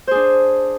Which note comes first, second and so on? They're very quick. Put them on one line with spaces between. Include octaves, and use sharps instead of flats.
C5 G#4 D4